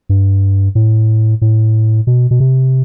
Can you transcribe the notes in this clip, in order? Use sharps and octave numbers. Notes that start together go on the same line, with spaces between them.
G2
A2
A2
B2
B2
C3